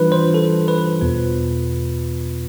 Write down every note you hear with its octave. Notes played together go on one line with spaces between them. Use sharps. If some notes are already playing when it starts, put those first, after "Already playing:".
Already playing: E3 G3 D4 F4 B4
C5
A4
B4
E2 B2 B3 F4